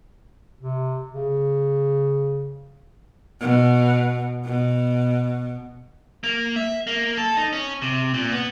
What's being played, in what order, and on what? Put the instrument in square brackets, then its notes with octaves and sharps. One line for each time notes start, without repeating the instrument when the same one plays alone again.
[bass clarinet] C3
C#3
[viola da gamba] B2
B2
[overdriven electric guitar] A#3
E5
A#3
A4
D#4
C#4
C3
A#2
B3